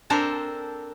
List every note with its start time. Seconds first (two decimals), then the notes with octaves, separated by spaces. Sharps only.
0.10 C4 D4 A4 A#4 C5